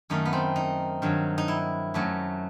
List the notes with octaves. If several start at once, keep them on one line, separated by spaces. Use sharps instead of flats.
F#2 D#3 A3 D#4
B3
C4
D#4
G2 D#3 F#3
D#4
E4
F#2 F#3 A3